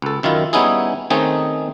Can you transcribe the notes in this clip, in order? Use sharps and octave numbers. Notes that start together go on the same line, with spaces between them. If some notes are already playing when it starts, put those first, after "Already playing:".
C#2 A4
F#2 D#3 E4 F4
G3 B3 C#4 D#4 E4 G#4
D#3 A3 C4 C#4 D#4 G#4